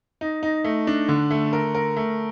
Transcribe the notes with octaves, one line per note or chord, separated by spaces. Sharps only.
D#4
D#4
A3
D4
D3
A3
A#4
A#4
A3